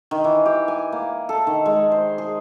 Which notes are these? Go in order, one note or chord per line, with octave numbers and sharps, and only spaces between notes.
D#3
E3
G4
G#5
A#3
A4
D#3
G#3
C5
G#4